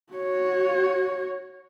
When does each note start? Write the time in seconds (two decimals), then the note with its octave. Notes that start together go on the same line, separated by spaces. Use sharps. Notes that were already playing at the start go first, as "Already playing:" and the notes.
0.13 F#4 C#5